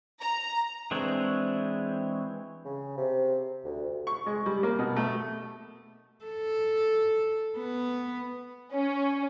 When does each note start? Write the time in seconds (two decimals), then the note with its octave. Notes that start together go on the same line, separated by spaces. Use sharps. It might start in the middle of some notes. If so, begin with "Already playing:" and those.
0.22 A#5
0.91 E3 G#3 C4 D4 C#5
2.65 C#3
2.97 C3
3.64 D2
4.07 C#6
4.26 G#3
4.46 G3
4.63 A#3
4.79 B2
4.96 A3
6.25 A4
7.58 B3
8.73 C#4